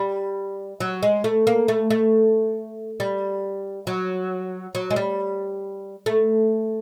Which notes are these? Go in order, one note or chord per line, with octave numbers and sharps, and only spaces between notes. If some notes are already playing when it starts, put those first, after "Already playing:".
Already playing: G3
F#3
G#3
A3
A#3
A3
A3
G3
F#3
F#3
G#3
G3
A3